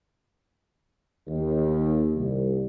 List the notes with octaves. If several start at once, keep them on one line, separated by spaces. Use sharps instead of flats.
D#2
C2